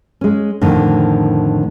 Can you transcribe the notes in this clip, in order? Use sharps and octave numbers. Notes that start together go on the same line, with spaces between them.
G#3 C#4
F2 A2 D3 D#3